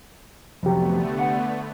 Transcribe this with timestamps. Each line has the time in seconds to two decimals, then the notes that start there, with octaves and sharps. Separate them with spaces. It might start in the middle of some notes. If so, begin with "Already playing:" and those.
0.63 C2 F2 D3 F#3 A3 B3 G4
1.19 F#5